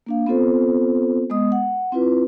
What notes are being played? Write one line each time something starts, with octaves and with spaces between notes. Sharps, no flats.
A#3 D4 F5
B3 C4 F4 A4 C5
G#3 B3 D#5 D#6
F#5
C4 E4 F4 B4